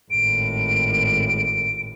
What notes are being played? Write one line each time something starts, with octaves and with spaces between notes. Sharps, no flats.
G#1 A2 D7